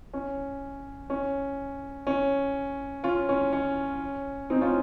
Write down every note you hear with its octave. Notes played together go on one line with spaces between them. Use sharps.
C#4
C#4
C#4
C#4 F4
C#4
C#4
C4 D#4
C#4 F4